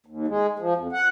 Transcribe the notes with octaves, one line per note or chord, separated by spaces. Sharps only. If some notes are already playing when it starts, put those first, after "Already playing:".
D#2
G#3
F3
F2
F#5